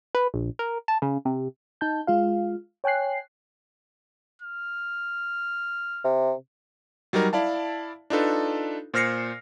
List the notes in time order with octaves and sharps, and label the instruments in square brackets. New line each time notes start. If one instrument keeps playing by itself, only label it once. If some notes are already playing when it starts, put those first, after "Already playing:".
[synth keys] B4
A#1
A#4
A5
C#3
C3
[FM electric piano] D#4 A5 G6
G#3 F4 F5
C#5 G5 G#5 F#6 C7
[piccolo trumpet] F6
[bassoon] C3
[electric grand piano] F#3 G3 D#4 A#4
E4 D5 F5 A5
D4 D#4 F4 A4 B4
A#2 C5 F6 A#6 C7 C#7